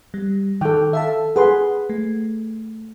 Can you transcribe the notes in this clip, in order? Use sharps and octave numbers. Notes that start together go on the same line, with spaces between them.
G3
D#3 A4 G5
A4 E5 F5 A5
G#4 B4 F#5 C6
A3